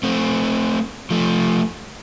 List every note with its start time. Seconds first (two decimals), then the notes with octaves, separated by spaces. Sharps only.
0.03 A3 C4
1.11 F3 A3